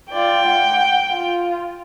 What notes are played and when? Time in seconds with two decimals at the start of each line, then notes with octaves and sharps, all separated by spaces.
0.12 F4 D5 G5
0.46 F#5
1.11 F4